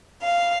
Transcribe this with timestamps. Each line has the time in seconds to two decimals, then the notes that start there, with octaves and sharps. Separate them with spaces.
0.23 F5